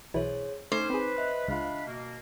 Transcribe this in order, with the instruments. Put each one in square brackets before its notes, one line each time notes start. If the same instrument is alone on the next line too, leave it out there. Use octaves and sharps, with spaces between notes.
[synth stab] B1 E3 E4 [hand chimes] G#4 C5 C#5
[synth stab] A3 [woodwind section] C#4 [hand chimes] D#4 D6 [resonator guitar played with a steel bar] C5
[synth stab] C4 G#4 [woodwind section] B4
[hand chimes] D#5 E5 F#6
[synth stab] C#2 F4 [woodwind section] D4 F5 B5
[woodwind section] B2 A#3